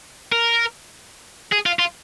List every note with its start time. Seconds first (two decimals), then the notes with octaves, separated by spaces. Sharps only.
0.32 A#4
1.52 G#4
1.66 F4
1.79 F4